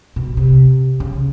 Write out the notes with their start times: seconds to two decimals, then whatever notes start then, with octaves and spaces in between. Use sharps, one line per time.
0.16 B2
0.37 C3
1.00 C#3